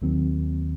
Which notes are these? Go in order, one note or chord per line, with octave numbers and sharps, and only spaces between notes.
D#2 D#3 F#3 C4